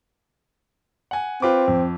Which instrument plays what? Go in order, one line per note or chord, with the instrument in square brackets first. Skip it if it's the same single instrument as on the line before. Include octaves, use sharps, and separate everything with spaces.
[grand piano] F#5 G#5
[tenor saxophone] C4 [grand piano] F4 B4 D6
[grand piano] F2